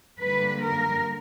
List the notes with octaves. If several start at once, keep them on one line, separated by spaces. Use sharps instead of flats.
D3 G3 A#3 B4
A#4